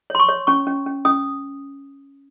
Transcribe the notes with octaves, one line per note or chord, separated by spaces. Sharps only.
C#5 C6
C#6
C#5
C#4 C#6
C#4
C#4
C#4 D#6